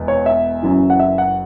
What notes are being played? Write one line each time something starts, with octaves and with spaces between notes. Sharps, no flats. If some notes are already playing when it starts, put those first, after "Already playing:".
Already playing: E1 E2
C#5
E5
F#1 F#2 E3
F#5
E5
F#5